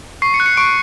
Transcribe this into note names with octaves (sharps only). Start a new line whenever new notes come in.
C#6 C7
C#7
F#6
C#7
C#6 D7